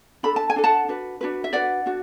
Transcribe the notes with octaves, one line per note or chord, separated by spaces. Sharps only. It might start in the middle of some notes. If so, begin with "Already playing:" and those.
D4 A4 B5
A5
G#5
D4 A4
F#5 A5
D4 F#4 B4
D4 F#4 B4
E5
D4 F#4 B4 D5 F#5
D4 F#4